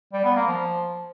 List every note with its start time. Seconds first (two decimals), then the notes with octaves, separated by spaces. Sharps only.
0.13 G3
0.24 B3
0.36 A#3
0.47 F3